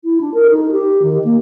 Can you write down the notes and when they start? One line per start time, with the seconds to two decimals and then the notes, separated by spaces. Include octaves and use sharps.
0.04 E4
0.21 D4
0.34 A#4
0.50 D#4
0.71 G4
1.02 D#3
1.24 A#3